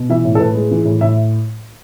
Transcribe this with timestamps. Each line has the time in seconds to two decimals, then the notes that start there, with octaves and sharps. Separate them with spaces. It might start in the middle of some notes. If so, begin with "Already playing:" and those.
Already playing: B2
0.09 E3 E5
0.25 A2
0.35 A4
0.40 A2 B4
0.55 G#3
0.71 E3
0.86 A2
1.01 A2 E5